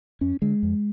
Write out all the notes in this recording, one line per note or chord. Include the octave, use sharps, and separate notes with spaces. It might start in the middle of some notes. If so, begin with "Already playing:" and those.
F2 C#4
D3 G#3
F2